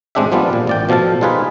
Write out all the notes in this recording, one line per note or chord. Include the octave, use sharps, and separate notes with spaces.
A1 G#3 C4 D4 G4 E5
F3 G3 B3 D4 F4
A#2
A1 D5 G5
B2 F3 A4 F5 A5
G3 D#4 F4 G#4 B4